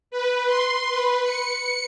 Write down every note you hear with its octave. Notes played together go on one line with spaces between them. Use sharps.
B4
C6
B4
C#7